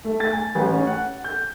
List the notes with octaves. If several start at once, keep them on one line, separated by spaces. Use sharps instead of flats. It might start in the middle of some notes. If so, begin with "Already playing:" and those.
A3
A6
G#5
A1
C#4
F#5
G6